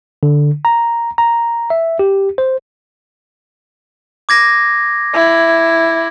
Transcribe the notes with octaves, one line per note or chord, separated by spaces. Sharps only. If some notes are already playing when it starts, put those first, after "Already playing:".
D3
A#5
A#5
E5
G4
C5
D6 G#6 A#6
E4